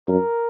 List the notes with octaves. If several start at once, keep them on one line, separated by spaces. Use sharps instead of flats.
F#2 A#4